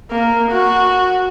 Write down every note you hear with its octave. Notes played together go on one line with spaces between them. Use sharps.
A#3
F#4